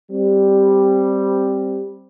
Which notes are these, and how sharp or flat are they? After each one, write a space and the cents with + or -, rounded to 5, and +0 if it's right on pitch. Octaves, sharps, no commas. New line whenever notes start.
G3 +0 C4 +0